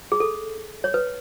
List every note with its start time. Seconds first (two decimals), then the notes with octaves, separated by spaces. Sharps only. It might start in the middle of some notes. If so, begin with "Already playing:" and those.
0.12 G#4
0.20 A4
0.84 C#5
0.94 B4